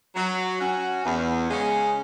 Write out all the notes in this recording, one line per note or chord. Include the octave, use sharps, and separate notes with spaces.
F#3
C#4 F#4
E2
C#3 G#3 C#4